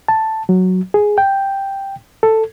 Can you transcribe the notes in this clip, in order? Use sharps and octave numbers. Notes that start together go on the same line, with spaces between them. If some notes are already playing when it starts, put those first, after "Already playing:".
A5
F#3
G#4
G5
A4